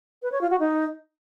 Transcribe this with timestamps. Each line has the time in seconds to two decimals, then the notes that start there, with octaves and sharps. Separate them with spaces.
0.22 B4
0.32 C#5
0.41 F4
0.50 F#4
0.60 D#4